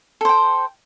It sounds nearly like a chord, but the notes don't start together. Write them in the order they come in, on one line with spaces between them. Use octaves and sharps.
A4 C5 G5